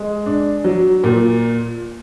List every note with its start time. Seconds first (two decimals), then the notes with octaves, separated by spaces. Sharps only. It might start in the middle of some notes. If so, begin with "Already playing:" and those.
Already playing: G#3
0.26 D4
0.64 F#3
1.04 A#2